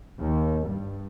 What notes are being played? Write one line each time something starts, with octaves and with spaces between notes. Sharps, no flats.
D#2
G2